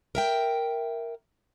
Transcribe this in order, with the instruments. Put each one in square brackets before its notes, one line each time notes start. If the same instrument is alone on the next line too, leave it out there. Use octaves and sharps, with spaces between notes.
[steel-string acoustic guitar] A#4 E5 G5